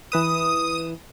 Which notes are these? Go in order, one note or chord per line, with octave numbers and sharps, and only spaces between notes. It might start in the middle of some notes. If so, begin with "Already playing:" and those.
E3 B4 D#6 E7